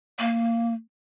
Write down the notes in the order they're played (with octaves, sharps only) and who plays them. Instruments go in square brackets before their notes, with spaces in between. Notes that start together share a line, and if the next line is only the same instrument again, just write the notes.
[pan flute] A#3